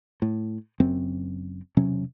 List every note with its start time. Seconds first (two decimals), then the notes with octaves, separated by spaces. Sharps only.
0.22 A2
0.80 F#1 F#2 C4
1.77 E1 C3 F#3 C#4